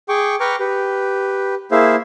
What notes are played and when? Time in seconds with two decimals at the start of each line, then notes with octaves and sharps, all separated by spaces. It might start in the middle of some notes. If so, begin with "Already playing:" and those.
0.09 G#4 G5 C#6 D6
0.40 B4 G5 A#5 C#6 D6 F6
0.60 G4 B4
1.72 A#3 E4 G#4 C5 E5 F5